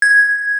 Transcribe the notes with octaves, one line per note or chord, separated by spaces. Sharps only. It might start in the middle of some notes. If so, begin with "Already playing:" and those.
G#6